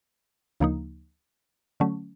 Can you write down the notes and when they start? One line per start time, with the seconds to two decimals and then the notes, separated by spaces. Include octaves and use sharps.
0.60 D2 C#3 F3 A#3 D#4
1.80 D3 F#3 A3 C#4